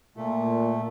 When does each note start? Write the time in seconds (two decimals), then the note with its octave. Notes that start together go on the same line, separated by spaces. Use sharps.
0.17 A#2 A3